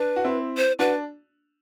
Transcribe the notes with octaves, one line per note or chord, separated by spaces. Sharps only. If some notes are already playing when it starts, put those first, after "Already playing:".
Already playing: D4 B4
F#4
C4 E4
C5
D4 F#4 B4